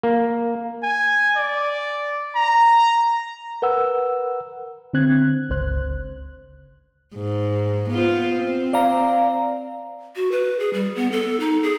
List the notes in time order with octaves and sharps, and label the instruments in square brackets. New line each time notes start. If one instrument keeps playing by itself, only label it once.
[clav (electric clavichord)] A#3
[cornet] G#5
D5
A#5
[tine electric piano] A#4 B4 F#5 E6
[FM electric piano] D3 C4 F#6 G#6
G1 C#2 C5 F#6
[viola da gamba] G#2
B3 F4 C5
C4
[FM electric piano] D5 F5 A#5
[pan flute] F#4
B4
G#4
G3
B3
A4
D#4
G#4